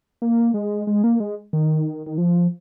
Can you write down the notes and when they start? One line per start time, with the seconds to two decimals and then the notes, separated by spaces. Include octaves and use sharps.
0.22 A#3
0.54 G#3
0.87 G#3
1.04 A#3
1.20 G#3
1.53 D#3
2.06 D#3
2.18 F3